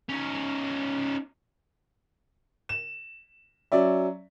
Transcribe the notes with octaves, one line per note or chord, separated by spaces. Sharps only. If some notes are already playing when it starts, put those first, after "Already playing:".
C#4 D#4
E7
F#3 C#4 D5 E5